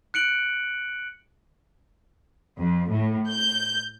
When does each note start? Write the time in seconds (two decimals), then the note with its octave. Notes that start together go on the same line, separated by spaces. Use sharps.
0.14 F#6 C#7 D7 F#7
2.59 F2
2.91 A2
3.29 G6